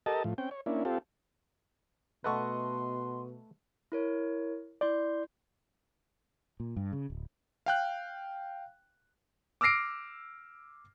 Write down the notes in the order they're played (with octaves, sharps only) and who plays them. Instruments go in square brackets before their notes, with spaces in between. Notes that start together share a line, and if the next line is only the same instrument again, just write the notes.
[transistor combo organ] G4 A4 A#4 D#5 A5
A2 F3
C4 C#4 G5
C#5
A#3 C#4 D4 E4
C4 F4 G4 A4
[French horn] B2 [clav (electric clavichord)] A3 A4 B4 [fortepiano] D#5 F#5 C#6 [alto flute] C6
[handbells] E4 A#4 C#5
[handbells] E4 C6 G6 [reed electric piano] D5
[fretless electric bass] A#2
G2
C#3
D1
[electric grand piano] F5 G5 F#6
D6 E6 F6 A#6 C7 D7